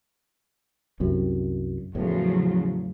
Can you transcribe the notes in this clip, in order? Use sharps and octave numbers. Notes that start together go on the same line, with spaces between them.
C2 F#2 C3
E2 A2 C#3 F3 F#3